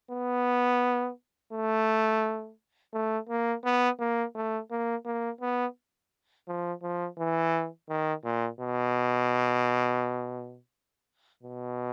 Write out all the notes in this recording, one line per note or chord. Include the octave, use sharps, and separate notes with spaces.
B3
A3
A3
A#3
B3
A#3
A3
A#3
A#3
B3
F3
F3
E3
D#3
A#2
B2
B2